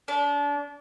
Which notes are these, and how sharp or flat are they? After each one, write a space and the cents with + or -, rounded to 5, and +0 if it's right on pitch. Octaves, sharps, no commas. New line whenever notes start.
D4 -30